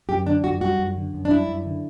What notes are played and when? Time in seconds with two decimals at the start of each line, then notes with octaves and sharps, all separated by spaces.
0.09 F#2 G4
0.27 D3 D4
0.44 F#2 F#4
0.61 G3 F#4
0.79 F#2
0.97 D3
1.14 F#2
1.25 D4
1.31 G3 E4
1.48 F#2
1.66 D3